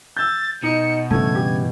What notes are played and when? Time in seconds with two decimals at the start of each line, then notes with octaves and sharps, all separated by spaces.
0.17 E6 G6 A6
0.63 B2 D#4 C#7
1.11 G2 C#3 E3 A3 G#6
1.35 G4